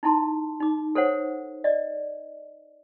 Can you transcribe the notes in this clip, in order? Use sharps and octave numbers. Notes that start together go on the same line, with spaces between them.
D#4 E4 A5 C6
D#4 D6
A4 C5 C#5 F#5
D5 D#5